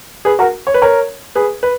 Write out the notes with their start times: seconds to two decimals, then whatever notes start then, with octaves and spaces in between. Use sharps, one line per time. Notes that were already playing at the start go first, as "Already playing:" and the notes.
0.25 G#4 B4
0.39 F#4 A#4
0.67 C#5
0.74 B4
0.82 A#4 C#5
1.35 G#4 B4
1.63 B4